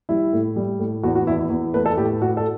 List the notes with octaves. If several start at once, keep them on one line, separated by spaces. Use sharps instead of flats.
G3 E4
A2
G3
A2
E2 F#4
F#4
E2 E4
E4
E2
A3 B4
A4
A2 G4
A2 F#4
A4